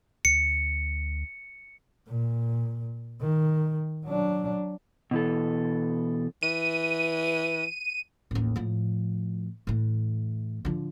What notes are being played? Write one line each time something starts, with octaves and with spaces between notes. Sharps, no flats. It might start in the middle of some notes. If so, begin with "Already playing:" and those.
D2 C#7
A#2
D#3
F#3 D4
B2 E3 A4
E3 D#7
A1 D#2
A2 F3
A2 E3
D3 F3